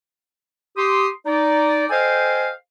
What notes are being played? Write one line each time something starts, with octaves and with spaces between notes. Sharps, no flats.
G4 C6 D#6
D#4 D5
A4 C5 D#5 F5 G5 G#5